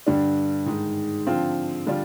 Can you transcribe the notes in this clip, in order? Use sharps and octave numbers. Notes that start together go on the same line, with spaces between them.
G2 D3 G3 D4
G#2 D#3 G#3
D3 F3 C4 F4
D3 G3 D4 F4